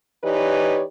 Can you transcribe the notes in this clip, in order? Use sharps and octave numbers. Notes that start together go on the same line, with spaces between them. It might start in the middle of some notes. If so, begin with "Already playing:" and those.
E3 D#4 G4 B4 C#5 D5